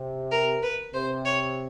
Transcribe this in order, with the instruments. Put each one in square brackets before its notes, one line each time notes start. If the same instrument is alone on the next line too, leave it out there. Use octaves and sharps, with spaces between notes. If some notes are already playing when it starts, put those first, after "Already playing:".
Already playing: [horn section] C3
[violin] A#4
B4
[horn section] C3 [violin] C5
[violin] C#5